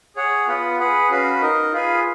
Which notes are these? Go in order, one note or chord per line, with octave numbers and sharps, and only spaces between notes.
G#4 C#5 F#5
B3 F4 B4 F#5
G#4 B4 F#5
C#4 F#4 B4 F5
D#4 A#4 D#5
F4 G#4 B4 F5 G#5